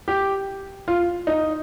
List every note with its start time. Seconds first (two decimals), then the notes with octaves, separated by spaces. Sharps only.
0.08 G4
0.88 F4
1.27 D#4